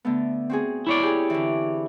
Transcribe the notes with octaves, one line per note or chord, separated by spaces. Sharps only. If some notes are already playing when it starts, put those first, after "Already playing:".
D3 A3 B3
C4 F#4 G#4
E4 C#5 D5
G4 G#4
D3 E3